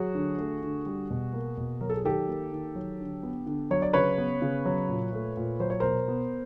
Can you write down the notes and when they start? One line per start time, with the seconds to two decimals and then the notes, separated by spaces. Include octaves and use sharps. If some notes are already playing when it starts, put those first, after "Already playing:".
Already playing: F#3 F#4 G#4
0.15 D3
0.38 A3
0.62 D3
0.86 G3
1.10 B2
1.33 A#3
1.57 B2
1.81 F#3 A#4
1.90 A4
1.97 G#4
2.04 D#3 G4 A4
2.28 A#3
2.52 D#3
2.75 F#3
3.00 D3
3.23 B3
3.46 D3
3.71 F#3 C#5
3.82 D5
3.93 C#3 B4 C#5
4.18 B3
4.42 C#3
4.66 F#3
4.89 A#2
5.13 A3
5.37 A#2
5.60 F#3 C5
5.70 C#5
5.80 B2 A#4 C5
6.08 B3